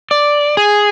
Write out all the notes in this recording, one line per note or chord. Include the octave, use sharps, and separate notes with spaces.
D5
G#4